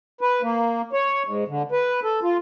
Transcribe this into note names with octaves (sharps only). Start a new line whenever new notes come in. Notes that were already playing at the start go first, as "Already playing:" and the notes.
B4
A#3
C#5
G#2
D3
B4
A4
F4